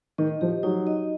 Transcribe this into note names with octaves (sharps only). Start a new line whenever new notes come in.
D#3 D#5
F3 G4
F#3 D#4
D#5